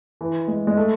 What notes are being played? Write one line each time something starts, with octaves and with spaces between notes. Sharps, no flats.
E3
G#3
G#3
A3